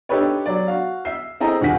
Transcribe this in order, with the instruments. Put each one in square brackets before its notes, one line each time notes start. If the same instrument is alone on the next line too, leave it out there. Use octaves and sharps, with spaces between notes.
[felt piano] D4 D#4 G4 A4 B4 C#5
F#3 D5
F#4 F5
E5 C7
C4 E4 G#4 A4 D#5 A#5
D#1 D#3 F4 F#5 G#5 B6